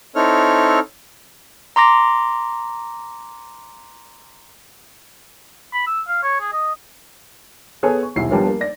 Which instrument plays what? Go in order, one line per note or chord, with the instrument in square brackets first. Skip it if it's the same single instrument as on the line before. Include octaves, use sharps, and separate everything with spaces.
[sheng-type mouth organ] C4 D#4 E4 A4 C#5 F6
[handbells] A#5 C6 D6 A#6
[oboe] B5
E6
F5
C#5
G#4
D#5
[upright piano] B3 G#4 A4 C#5 G#5
C#6
D#1 B1 E4 C7
F3 G3 B3 D4 A#4 C#5
A#3
D5 A#6